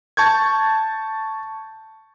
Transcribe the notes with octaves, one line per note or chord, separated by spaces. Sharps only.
A5 C#6 G6 G#6